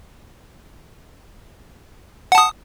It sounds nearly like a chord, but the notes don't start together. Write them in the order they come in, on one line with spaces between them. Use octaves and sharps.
F#5 A5 D#6